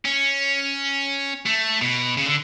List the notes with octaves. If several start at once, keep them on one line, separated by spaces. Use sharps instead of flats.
C#4
A3
B2
C#3
D3